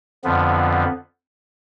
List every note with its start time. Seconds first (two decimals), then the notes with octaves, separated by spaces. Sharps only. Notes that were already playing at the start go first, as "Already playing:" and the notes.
0.24 F2 D3 F3 B3